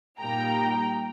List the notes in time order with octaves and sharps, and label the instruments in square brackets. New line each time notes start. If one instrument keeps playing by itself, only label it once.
[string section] A#2 G3 A#3 D#4 G5 A#5